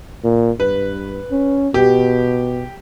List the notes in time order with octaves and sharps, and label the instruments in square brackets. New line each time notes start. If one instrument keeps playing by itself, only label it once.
[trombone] A#2
[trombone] G2 [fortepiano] B4
[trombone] C#4
[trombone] B2 [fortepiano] G4